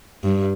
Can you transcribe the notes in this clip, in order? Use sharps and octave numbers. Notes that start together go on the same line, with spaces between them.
G2